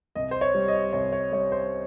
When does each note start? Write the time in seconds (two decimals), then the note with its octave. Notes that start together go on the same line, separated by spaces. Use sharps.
0.15 C2 D#5
0.31 C5
0.41 C#5
0.55 G3
0.68 D#5
0.93 C2 C#5
1.13 C#5
1.32 G3 C#5
1.52 C5